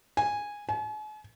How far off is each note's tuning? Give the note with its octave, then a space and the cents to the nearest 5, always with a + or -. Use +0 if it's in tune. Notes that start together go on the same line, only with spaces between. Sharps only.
G#5 -10
G#5 +45